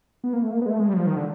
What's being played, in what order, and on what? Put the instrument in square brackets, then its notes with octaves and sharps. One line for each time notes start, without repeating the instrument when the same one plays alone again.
[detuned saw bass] B3
A#3
A3
A#3
B3
G#3
A3
G#3
G3
F#3
F3
D#3
D3